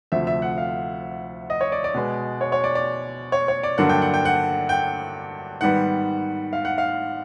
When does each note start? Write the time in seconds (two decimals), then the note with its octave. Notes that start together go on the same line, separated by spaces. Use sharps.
0.12 D2 C3 F3 A3 E5
0.27 E5
0.42 F#5
0.58 F5
1.50 D#5
1.61 C#5
1.72 D5
1.84 D5
1.95 B2 G#3 B3
2.41 C#5
2.52 C#5
2.64 D5
2.75 D5
3.32 C#5
3.48 C#5
3.63 D5
3.78 G2 D3 F#3 A#3 D4 F#5
3.89 G5
4.02 F#5
4.14 G5
4.25 F#5
4.69 G5
5.61 G#2 D#3 G3 B3 F#5
6.53 F5
6.65 F#5
6.78 F5